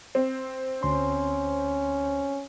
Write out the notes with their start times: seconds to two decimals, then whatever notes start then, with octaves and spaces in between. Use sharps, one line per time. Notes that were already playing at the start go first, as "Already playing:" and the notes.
0.15 C4
0.83 D2 C#4 C6